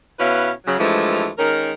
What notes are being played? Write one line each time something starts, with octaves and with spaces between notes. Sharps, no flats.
B2 C#4 E4 B4 F5
C#3 F#3
G2 E3 F3 G#3 A3
D#3 G#3 C#4 A#4